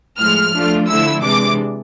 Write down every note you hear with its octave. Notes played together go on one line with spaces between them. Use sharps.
A2 F3 G#3 F6
F3 A3 D4 F4
D3 F3 A3 E4 E6
C3 E3 G#3 D4 D6